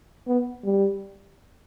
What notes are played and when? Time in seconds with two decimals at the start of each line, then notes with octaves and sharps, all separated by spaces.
0.27 B3
0.65 G3